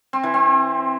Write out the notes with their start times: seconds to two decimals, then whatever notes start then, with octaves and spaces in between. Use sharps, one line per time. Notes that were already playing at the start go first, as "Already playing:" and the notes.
0.13 C4
0.23 E3
0.34 C4